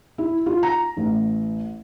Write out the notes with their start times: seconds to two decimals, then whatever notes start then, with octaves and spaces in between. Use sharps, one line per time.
0.18 E4
0.46 F4
0.63 A#5
0.97 A1